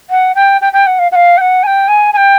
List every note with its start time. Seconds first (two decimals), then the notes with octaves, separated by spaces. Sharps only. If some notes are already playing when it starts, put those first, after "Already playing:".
0.10 F#5
0.35 G5
0.61 G5
0.73 G5
0.86 F#5
0.99 F5
1.11 F#5
1.15 F5
1.37 G5
1.41 F#5
1.63 G#5
1.66 G5
1.88 G#5
2.13 G#5
2.17 G5